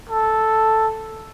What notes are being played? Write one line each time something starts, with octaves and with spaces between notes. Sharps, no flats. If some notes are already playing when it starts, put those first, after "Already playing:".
A4